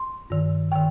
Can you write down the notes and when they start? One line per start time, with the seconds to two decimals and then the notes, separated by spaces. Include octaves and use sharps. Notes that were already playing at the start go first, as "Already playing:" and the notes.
Already playing: C6
0.30 G2 D#3
0.72 D#3 G5